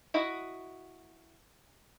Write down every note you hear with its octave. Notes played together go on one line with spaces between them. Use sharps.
E4 F#4 D#5